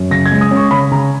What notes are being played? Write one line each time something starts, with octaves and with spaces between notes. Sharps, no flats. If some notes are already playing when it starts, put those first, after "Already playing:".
Already playing: F#2
C#3 A#6
G#6
G#3
D#6
C#4
C#6
C#3 B5
C#3 A#5